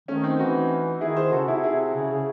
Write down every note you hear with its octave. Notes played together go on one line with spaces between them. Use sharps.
D#3 A3 C#4
C4 D#4
E3 D#4 F#4
D#3 E4 G#4
G#4 C5
C#3 F#4 A4
C3 E4 G#4
C3 E4 G#4
C#3
C#3